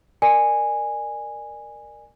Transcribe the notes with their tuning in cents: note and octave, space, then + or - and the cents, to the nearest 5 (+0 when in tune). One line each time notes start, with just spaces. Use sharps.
A#4 +0 D5 +30 G#5 -10